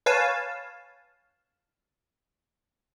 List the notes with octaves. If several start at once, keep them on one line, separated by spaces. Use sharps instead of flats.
B4 C#5 F5 G#5 A5